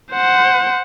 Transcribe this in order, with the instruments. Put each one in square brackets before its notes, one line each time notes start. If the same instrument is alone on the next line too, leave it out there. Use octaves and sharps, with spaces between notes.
[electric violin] C5 F#5